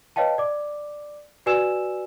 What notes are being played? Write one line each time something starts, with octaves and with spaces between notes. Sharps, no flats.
B4 C#5 D#5 F5 G5 A5
D5 D6
F#4 B4 D5 G#5 E6 E7